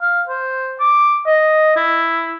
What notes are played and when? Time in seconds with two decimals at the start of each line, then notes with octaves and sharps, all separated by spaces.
0.02 F5
0.29 C5
0.80 D6
1.26 D#5
1.76 E4